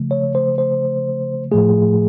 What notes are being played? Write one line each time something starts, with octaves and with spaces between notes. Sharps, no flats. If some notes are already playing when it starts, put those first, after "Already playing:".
Already playing: C#3 F3 A3
C#5
C5
C5
A2 F3 A3 G#4